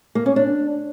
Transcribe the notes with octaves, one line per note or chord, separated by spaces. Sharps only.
A#3
C#4
D4